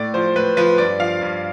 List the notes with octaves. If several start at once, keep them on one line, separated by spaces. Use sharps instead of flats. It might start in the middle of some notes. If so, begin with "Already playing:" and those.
Already playing: A2 D5
F3 C5
A2 B4
F3 B4
G2 D5
F3 F5
G2